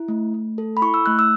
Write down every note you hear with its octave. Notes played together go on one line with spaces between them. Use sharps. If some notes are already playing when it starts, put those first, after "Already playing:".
Already playing: E4
A3
A3
A4
B5
E4 C#6
E6
A3 F#6
E6